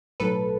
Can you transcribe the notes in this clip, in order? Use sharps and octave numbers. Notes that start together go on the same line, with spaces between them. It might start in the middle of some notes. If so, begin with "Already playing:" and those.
B1 A2 F#3 A4 B4